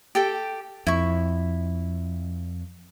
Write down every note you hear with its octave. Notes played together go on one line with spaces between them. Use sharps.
G4 A4 G5
F2 E4 C#6